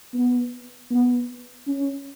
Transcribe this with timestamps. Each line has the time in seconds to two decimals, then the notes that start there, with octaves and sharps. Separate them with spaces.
0.14 B3
0.91 B3
1.67 C#4